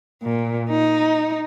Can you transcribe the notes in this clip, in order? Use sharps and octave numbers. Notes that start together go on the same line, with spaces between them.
A#2
D#4